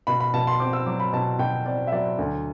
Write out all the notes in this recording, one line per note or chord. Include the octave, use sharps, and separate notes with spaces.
B2 B5
B5
B2 A5
C6
C4 D6
E6
F#3 D6
B5
B2 A5
B2 G5
C4 D5
E5
F#3 D5
D2